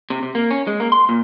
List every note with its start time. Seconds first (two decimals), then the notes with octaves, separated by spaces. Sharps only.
0.10 C3
0.23 C3
0.35 A#3
0.50 C#4
0.67 G#3
0.80 A#3
0.92 C6
1.09 A#2